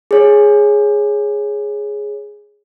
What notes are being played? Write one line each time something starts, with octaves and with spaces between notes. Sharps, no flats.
G#4 C#5